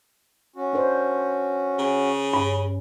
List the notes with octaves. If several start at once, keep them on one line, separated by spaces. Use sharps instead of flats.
C#4 F#4
D4 A#4 C5
C#3
G2 C#4